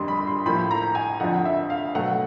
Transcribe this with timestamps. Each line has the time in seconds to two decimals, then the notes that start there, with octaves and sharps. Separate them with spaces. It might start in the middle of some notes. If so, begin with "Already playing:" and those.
Already playing: F2 D3 G3 C6
0.08 B5
0.27 C6
0.46 A2 F3 A#3 B5
0.71 A#5
0.95 G#5
1.20 F2 D3 F3 F#5
1.45 E5
1.70 F5
1.95 B2 F#3 A3 F#5